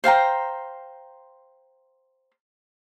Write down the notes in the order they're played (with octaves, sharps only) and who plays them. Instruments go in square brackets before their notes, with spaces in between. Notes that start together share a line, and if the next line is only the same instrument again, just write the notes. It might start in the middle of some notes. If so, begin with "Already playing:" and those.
[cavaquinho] C5 F5 G5 A#5